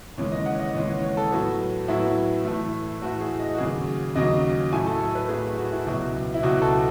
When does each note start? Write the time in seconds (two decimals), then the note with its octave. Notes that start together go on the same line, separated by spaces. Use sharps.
0.18 D#2 C#3 E3 G#3 C#5
0.32 D#5
0.46 F#5
0.55 C#5
0.60 D#5
0.75 D#2 C#3 E3 G#3 C#5
0.88 C#5
1.03 C#5
1.17 A4
1.31 A2 F#3 B3
1.88 A2 F#3 B3 E4
2.45 A2 E3 A3
3.02 A2 E3 A3 F#4
3.21 G#4
3.40 D#5
3.54 F#4
3.58 D#2 C#3 F#3 G#4
4.15 D#2 C#3 F#3 D#5
4.72 A2 F#3 A3 G#5
4.87 A4
5.01 A4
5.15 B4
5.29 A2 F#3 A3 G#4
5.57 F#4
5.72 E4
5.86 C#2 B2 F#3 B3 E4
6.34 E4
6.43 C#2 B2 F#3 B3 F#4
6.62 A4